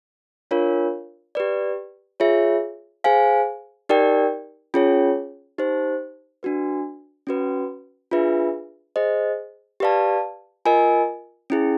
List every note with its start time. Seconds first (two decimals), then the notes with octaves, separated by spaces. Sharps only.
0.51 D4 F4 A#4 C#5 F5
1.35 G4 B4 D5
2.20 F4 G#4 C#5 E5
3.04 G#4 C5 F5 G#5
3.89 D#4 G4 A#4 D5 G5
4.74 C#4 F4 G#4 C#5
5.58 D#4 G4 C5
6.43 D4 F#4 B4
7.27 C#4 F#4 B4
8.11 D4 F4 G#4 B4 E5
8.96 G#4 C5 D#5
9.80 G4 B4 D5 F5 A5
10.66 F4 A#4 D#5 G#5
11.50 C#4 E4 G#4